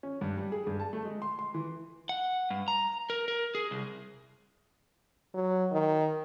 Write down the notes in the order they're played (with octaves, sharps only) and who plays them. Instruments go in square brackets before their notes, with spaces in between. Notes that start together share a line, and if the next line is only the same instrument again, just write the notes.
[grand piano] C#4
G2
G3
G#4
G2
A5
A3
G#3
C6
C6
E3
[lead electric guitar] F#5
G2
A#5
A#4
A#4
G#4
C2
[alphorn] F#3
D#3